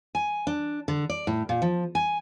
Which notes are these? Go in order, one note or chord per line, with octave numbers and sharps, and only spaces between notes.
G#5
D4
D3
D5
A2
A#2
F3
G#5